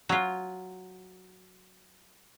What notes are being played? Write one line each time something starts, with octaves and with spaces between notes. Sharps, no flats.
F#3 F4